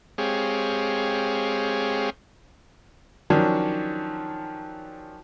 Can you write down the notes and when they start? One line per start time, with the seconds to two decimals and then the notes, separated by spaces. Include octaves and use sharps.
0.18 G#3 C4 G4 G#4 C#5 F5
3.30 D#3 F3 F#3 C#4 D4